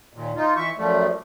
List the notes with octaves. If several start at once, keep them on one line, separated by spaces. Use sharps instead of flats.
D#2 A#2
D#4 F4
E3 E5 C#6
F#2 F3 G3 A3